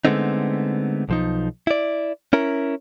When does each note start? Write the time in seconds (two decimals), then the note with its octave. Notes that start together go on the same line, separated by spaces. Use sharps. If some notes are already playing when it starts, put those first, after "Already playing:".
0.05 D3 G#3 A3 B3 C4 D#4
1.09 B1 F3 D#4
1.67 E4 D5
2.33 C#4 E4 A#4